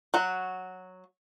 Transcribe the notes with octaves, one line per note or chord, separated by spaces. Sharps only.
F#3 F#4